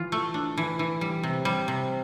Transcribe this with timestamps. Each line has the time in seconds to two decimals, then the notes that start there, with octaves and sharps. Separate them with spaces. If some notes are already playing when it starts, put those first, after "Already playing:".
Already playing: E3 F4
0.12 A3
0.34 D4
0.58 E3
0.79 E3
1.01 G3
1.23 C3
1.45 G3
1.68 C3